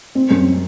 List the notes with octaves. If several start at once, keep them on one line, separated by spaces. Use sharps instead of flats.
C4
F#2